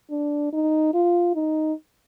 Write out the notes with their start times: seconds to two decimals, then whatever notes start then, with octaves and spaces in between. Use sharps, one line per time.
0.10 D4
0.53 D#4
0.94 F4
1.35 D#4